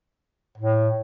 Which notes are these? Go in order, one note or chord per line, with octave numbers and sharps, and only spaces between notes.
A2